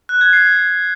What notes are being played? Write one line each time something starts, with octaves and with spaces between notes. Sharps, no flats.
F#6
G#6
C7